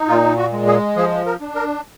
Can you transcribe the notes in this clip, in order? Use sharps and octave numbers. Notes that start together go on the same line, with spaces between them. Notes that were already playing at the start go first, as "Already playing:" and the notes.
Already playing: D#4
A#2 F4
F#4
G#3
G#4
F3 G#4
A#4
D4
A#4